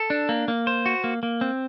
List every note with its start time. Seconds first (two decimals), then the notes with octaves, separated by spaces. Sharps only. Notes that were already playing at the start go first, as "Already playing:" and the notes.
Already playing: A4
0.10 D4
0.29 A#3
0.48 A#3
0.67 C5
0.86 F#4
1.04 A#3
1.23 A#3
1.41 C4